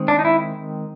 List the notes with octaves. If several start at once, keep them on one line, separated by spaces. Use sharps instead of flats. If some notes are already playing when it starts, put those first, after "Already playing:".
Already playing: D#3 G#3 C4
D4
D#4
E4